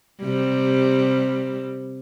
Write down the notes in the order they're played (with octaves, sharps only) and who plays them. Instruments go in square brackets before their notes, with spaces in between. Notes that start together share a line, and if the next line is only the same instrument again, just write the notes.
[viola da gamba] C3 G3